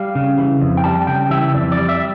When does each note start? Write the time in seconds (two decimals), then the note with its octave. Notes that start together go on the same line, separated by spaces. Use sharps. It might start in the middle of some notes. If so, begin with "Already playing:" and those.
Already playing: G3 F5
0.15 C#3
0.38 E3
0.61 F2
0.77 G5
0.84 G3 A5
1.07 C#3 G5
1.30 E3 E5
1.54 F2 D5
1.72 D5
1.77 G3
1.89 E5